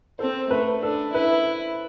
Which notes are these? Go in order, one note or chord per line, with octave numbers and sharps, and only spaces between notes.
C4 A4 C5
A3 B4
D4 A4
E4 B4